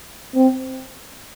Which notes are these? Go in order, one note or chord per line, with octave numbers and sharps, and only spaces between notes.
C4